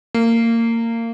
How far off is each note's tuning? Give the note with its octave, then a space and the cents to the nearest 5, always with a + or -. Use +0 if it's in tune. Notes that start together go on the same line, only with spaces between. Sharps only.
A#3 -25